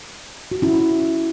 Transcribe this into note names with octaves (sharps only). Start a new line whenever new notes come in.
F#4
C#4 E4